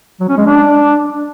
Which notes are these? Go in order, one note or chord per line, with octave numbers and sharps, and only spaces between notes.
F#3
C#4
G#3
D4